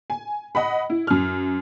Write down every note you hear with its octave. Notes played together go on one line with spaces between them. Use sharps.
G#5
D#5 F#5 B5
E4
F#2 F6